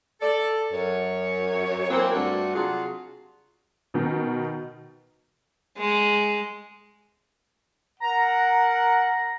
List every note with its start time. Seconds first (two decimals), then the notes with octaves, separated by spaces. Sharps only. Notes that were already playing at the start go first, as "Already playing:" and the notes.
0.21 A4 D5
0.73 F#2 C#5
1.90 F#2 E3 A#3 C4
2.13 G2 A3 D4 F4 F#4
2.54 C3 F#3 D4 F4 F#4 G#4
3.94 B2 D#3
5.77 G#3
8.00 A#4 F#5 A#5